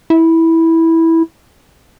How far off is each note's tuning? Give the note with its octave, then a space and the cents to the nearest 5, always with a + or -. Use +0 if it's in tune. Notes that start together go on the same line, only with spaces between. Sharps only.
E4 -10